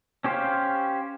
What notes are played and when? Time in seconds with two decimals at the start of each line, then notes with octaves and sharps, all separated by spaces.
0.24 C#4 G4 C5 C#5 F5